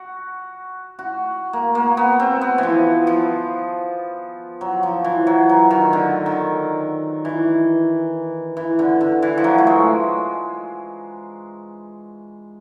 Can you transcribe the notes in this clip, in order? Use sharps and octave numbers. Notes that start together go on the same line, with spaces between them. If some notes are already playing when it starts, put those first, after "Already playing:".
Already playing: F#4
F#4
A#3
A#3
B3
C4
B3
E3 F3
F3
F#3
F3
E3
F#3
F#3
D#3
D3
D#3
E3
E3
D3
D3
E3
F3
F#3
A3
G#3